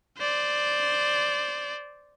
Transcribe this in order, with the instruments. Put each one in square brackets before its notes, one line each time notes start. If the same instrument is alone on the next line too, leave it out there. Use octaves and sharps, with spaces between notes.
[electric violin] C5 D5